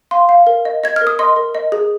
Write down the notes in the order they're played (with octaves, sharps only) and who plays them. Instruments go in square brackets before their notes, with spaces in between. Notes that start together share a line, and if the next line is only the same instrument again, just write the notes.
[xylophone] F5 C6
F5
A#4
D#5
D#5 G#6
F6
A#4
D#6
D#5 C6
A#4
D#5
G#4